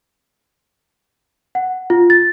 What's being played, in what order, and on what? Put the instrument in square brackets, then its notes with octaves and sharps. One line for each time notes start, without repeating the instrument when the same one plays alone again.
[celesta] F#5
F4
A6